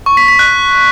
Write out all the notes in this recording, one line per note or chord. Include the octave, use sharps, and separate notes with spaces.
C#6
B6
B6
F#6